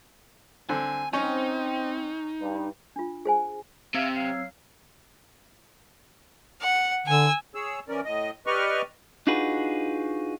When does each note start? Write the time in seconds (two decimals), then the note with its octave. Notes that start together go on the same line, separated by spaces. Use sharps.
0.69 D3 C4 G#5
1.13 C4 C#4 D#4
2.40 G2
2.96 D4 F4
3.25 G#4 C5 G#5
3.95 C3 C4 E5 F5 E6 G#6
4.15 F#3 F5 C7
6.61 F#5
7.07 D3 G#5 E6
7.55 G#4 C#5 E6
7.88 E3 C#4 A#4 D5
8.05 A2 D#5
8.47 G4 B4 D5 D#5 C#6 F6
9.27 D4 D#4 F4 F#4 G#4 B4